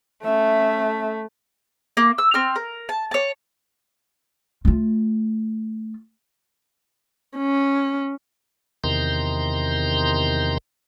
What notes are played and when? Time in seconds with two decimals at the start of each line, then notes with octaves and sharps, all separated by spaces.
0.23 A3 C#4 E5
1.97 A#3
2.18 E6
2.34 C4 F6
2.56 A#4
2.89 A5
3.11 C#5 A5
4.65 A3 F4
7.38 C#4
8.84 E2 C3 D#3 A#5 C6 G6